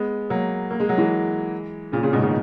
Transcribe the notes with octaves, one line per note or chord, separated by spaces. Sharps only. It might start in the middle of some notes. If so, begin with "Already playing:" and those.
Already playing: G#3 B3
F#3 A#3
A#3
G#3
F#3
E3 G#3
A#2 C#3
A#2 C#3
G#2 B2
C#3
B2 D#3